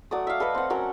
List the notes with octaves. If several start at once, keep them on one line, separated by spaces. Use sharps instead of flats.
F#3 A3 D5 D#6
E5 F5
A4 B4 D#5 F5
C4 F#5
F#3 C#4 A4 A#4